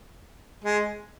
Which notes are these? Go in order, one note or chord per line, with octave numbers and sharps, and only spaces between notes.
G#3